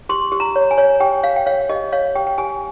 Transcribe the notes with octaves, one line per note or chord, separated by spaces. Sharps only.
G4 C6
G4
A#5
C#5
G#5
C#5
G4 G5
C#5 F5
G5
C#5 F5
G4 D#5
C#5 F5
G4 G5
G5
G4 G#5